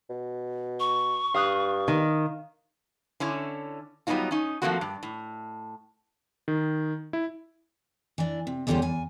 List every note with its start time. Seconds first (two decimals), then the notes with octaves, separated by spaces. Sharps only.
0.10 B2
0.80 C#6
1.34 G2 F5 D#6 F#6
1.88 D#3
3.20 D3 C#4 E4
4.07 F#3 G3 B3 C#4 D#4 F4
4.31 C#4 D#4
4.62 F3 G3 A3 A#3 C4 F#4
4.81 G2
5.03 A2
6.48 D#3
7.13 E4
8.18 E3 D4
8.47 C3
8.67 E2 D3 G3 C#4 G4 C5
8.82 E2 G#5